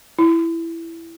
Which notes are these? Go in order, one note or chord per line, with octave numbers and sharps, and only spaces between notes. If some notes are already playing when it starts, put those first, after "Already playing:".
E4